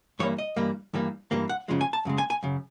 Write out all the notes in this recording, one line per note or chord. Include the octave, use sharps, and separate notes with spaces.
G2 E3 G3 A#3 C#5
D#5
G2 E3 G3 A#3
G2 E3 G3 A#3
G2 E3 G3 A#3
F#5
F#2 C#3 F3 G#3
G#5
A5
F#2 C#3 G#3
G#5
G#5
F#2 C#3